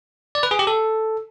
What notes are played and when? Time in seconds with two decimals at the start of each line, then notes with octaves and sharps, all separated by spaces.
0.35 D5
0.43 B4
0.51 G#4
0.59 G4
0.67 A4